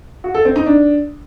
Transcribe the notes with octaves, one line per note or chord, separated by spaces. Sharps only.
F#4
A4
C4
D#4
D4